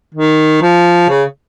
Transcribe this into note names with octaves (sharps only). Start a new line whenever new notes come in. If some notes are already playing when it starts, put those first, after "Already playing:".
D#3
F3
C#3